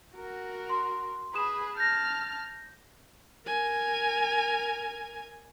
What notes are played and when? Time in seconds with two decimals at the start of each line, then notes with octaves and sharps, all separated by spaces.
0.16 F#4 A#4
0.69 C6
1.34 G#4 B4 B5 D#6 E7
1.77 A5 F6 G6 A#6
3.46 A#4 G#5